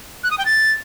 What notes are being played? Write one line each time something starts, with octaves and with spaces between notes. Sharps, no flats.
F#6
D#6
G5
A6